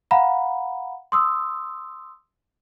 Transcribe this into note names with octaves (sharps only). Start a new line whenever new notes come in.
F5 F#5 A#5 B5
C6 D#6 E6